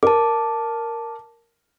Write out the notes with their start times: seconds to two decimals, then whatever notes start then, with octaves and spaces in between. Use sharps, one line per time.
0.03 A#4 A5 D6